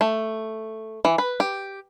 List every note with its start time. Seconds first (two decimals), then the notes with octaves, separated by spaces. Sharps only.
0.01 A3
1.05 E3
1.18 B4
1.40 G4